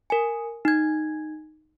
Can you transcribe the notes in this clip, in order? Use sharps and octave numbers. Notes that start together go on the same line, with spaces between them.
A#4 G#5
D#4 G#6